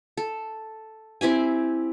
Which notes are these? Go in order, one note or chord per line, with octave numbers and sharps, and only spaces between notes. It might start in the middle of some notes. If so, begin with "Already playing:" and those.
A4
C4 E4 G4 G#5